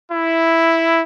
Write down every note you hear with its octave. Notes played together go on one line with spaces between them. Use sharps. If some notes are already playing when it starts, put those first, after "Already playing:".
E4